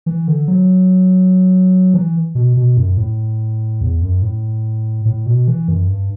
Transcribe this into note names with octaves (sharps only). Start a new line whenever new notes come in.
E3
D3
F#3
E3
B2
B2
F#2
A2
E2
F#2
A2
A2
B2
E3
F#2
G2